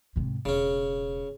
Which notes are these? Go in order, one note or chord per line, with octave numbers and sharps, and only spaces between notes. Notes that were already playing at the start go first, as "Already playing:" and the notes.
G#2 C3
E1 C#3 C#4